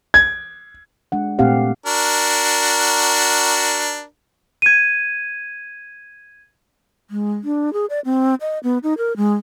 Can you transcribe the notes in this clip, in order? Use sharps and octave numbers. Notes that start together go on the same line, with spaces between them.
G#6
G#3 D4 F#5
A#2 A3 C4 G4 F5 F#5
D4 F#4 A#4
G#6 D#7
G#3
D4
G#4
D5
C4
D#5
B3
D#4
A#4
G#3